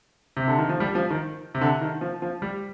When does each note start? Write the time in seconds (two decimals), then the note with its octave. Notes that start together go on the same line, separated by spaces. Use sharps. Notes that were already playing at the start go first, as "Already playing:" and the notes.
0.37 C3
0.48 D3
0.58 D#3
0.69 F3
0.80 G3
0.95 F3
1.11 D#3
1.55 C3
1.61 D3
1.81 D#3
2.01 F3
2.22 F3
2.42 G3